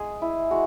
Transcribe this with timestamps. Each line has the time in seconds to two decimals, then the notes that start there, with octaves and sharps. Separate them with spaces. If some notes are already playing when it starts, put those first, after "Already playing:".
Already playing: G#3 G#4
0.22 E4
0.51 G#3 F#4